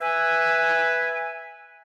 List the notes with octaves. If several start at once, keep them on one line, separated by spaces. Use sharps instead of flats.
B4 E5 G#5